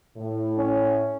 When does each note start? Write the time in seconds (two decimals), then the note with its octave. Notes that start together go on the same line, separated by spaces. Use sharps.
0.16 A2
0.58 C#4